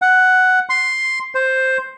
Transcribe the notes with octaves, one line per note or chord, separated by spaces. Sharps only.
F#5
C6
C5